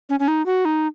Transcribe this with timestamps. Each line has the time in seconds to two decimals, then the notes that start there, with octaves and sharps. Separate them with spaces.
0.09 C#4
0.20 C#4
0.28 D#4
0.46 F#4
0.65 D#4